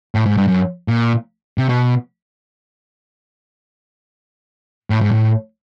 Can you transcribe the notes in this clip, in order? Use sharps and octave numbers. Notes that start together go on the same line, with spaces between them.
A2
G#2
G2
F#2
A#2
C3
B2
A2
G#2
A2